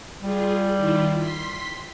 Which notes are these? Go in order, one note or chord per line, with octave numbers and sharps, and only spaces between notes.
G3 F4 G#4
D#3 E4 F4
C6 B6